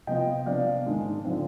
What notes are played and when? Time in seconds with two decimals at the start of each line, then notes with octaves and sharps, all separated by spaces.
0.07 C3 F3 B3 F4 D#5 G5
0.46 C3 F3 B3 D4 D5 F5
0.86 G#2 D#3 G#3 D4
1.25 D3 F3 C4